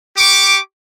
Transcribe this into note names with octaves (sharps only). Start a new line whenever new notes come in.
G4 C#6 D6